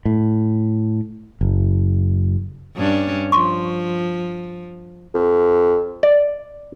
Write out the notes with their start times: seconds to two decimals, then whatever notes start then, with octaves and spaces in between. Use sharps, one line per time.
0.05 A2
1.41 F#1
2.76 G2 C#4 D4
3.32 F3 C6 C#6
5.15 F2
6.03 D5